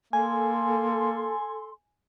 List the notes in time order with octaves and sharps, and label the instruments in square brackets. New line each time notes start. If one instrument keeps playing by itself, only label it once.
[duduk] A#3 [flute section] A4 C6 [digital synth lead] G#5